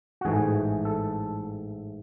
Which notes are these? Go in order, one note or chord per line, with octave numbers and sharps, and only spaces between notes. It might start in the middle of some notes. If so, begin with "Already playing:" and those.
F#4
A1 G#2 E3 A3 G#4
A4